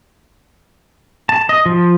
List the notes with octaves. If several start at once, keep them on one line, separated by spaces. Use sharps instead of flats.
A5
D#5
F3